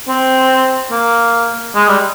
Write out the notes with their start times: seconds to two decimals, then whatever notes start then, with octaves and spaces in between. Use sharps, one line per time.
0.08 C4
0.91 A#3
1.75 G#3
1.88 G3